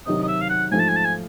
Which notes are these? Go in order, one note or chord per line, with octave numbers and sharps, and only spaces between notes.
C3 D#3 F#3 D#5
D#5
E5
F5
F#5
G#2 F3 A3 G#5
A5
G#5
A5
G#5